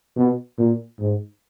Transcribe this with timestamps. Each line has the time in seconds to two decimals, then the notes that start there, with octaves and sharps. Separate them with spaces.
0.16 B2
0.58 A#2
0.99 G#2